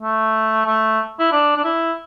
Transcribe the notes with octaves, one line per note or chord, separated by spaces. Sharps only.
A3
A3
E4
D4
D4
E4